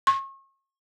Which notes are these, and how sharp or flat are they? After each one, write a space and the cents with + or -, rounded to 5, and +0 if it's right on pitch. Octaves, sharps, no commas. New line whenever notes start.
C#6 -35